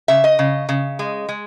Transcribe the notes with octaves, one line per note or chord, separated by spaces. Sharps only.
C#3 E5
D#5
C#3
C#3
G#3
G#3